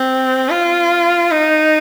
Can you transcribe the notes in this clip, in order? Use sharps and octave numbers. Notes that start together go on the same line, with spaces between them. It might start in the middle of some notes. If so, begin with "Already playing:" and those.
Already playing: C4
F4
D#4